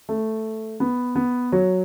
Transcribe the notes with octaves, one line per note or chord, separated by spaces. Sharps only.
A3
B3
B3
F#3